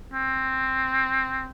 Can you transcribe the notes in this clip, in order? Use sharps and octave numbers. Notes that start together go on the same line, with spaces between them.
C4